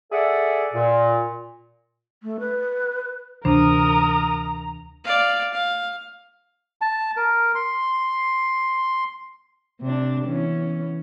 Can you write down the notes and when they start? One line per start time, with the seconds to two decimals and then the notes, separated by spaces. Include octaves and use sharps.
0.11 G#4 A4 D5 E5 F#5
0.73 A#2
2.23 A3
2.40 B4
3.45 D2 C3 E3 D4 A#4 C5 A#5 D#6
5.04 D5 F5
5.53 F5
6.81 A5
7.17 A#4
7.55 C6
9.81 C3 D4
10.26 E3 B3 C#4